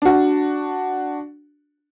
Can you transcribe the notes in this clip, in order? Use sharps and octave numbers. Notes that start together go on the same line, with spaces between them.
D4 F#4